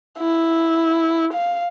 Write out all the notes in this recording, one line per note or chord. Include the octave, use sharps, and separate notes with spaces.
E4
F5